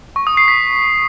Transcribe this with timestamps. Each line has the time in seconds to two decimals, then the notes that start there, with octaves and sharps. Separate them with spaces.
0.16 C#6
0.27 D#6
0.37 C7
0.48 B6